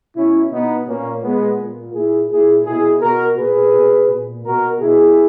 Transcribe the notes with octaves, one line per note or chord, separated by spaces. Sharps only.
B2 C#4 E4
B2 B3 D#4
A#2 A#3 C#4
A#2 G#3 B3
A#2
A#2 E4 G#4
A#2 E4 G#4
B2 E4 G#4
B2 F#4 A#4
A#2 G#4 B4
B2
A#2
B2 F#4 A#4
B2 E4 G#4